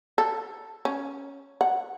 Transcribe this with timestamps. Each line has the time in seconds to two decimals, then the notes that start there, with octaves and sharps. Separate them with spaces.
0.18 A4
0.85 C#4
1.61 F#5